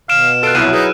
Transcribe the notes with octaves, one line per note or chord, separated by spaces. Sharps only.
B2 F5 F6 D7 E7
F4 A4 F6 F#6 D7
C2 B2 F#3 E4 E6 F#6 D#7
D#4 G#4 B4